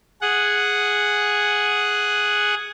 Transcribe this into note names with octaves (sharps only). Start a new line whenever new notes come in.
G#4 F#5